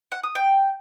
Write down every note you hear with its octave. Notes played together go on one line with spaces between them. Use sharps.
F#5
D#6
G5